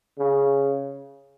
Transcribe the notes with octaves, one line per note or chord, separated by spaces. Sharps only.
C#3